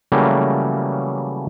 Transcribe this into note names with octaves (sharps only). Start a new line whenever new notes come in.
C#3 E3 F#3 G3 A3 A#3